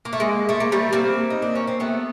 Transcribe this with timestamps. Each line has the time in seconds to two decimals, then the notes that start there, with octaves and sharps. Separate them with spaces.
0.05 A#3
0.13 A3
0.20 G#3 A#3
0.49 A3
0.60 A#3
0.72 G3 A3
0.93 A#3 C4
1.30 D#4
1.42 D4
1.55 C#4
1.67 C4
1.80 A3 B3